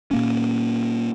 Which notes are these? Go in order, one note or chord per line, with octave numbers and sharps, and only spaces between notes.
A#2 A#3 C#4